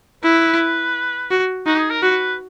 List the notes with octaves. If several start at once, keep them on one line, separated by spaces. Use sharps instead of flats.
E4 B4
F#4
D#4 F#4
G#4
A#4
F#4 B4